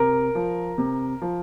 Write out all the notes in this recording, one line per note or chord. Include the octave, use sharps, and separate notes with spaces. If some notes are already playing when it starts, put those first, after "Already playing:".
Already playing: C3 A#4
F3
C3
F3